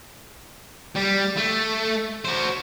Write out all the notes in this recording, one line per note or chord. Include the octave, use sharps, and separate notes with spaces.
G3
A3
F#4 C5